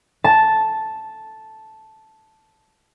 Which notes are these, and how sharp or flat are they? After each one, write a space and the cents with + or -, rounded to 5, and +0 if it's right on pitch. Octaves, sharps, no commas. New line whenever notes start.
A5 -5